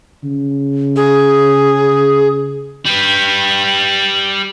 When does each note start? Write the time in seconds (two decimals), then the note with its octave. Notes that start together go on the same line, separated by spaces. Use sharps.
0.24 C#3
0.96 G#4
2.86 G3 B4